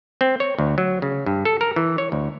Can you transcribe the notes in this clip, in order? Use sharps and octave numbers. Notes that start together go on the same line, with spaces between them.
C4
C#5
D2
F#3
C#3
G2
A4
A#4
E3
C#5
D2